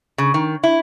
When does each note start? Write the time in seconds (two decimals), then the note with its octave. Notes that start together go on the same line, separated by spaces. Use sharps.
0.18 C#3
0.34 D#3
0.64 E4